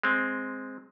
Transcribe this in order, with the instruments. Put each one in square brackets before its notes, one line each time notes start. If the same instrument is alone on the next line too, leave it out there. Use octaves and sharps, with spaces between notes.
[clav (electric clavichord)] G#3 C4